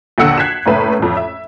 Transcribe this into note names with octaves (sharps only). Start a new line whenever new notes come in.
A#1 D#2 D3 F#5 E6 C#7
F#6 G#6 B6 C7 E7
F#1 A2 B4 E5
A1 F2
E5